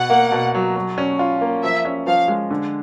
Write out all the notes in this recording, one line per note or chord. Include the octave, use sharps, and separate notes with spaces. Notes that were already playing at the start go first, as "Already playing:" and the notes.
Already playing: B2 F#5
A#3
B2
F#3
F#3
C#4
F4
A#3
F3 E5
C#4
F3 F5
G#3
D3